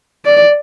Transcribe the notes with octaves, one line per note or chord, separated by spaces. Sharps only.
D5